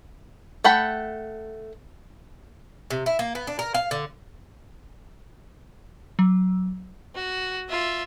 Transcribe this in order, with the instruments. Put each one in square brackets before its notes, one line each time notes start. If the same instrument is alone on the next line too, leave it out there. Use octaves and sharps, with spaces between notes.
[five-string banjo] A3 F#5 G5 B5
[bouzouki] C3
E4
A#3
B3
D4
A#4
F5
D3
[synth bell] F#3
[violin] F#4
F4 E5